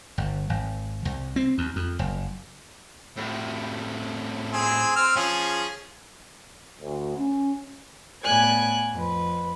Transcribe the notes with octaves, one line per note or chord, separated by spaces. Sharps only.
G1
G#1
C2
C4
D#2
F2
F#1
A2 C3
C4 G#4
C4 F6
F3 C#4 G#4
D2
C#4
A2 B3 D5 G#5 F#6 G#6
F2 B4